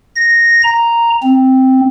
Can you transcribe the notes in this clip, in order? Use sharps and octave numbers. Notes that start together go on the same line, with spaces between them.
A#6
A#5
C4